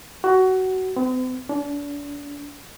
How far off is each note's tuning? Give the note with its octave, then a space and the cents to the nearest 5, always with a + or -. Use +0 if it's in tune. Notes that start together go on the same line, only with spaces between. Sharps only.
F#4 +20
C4 -45
D4 -35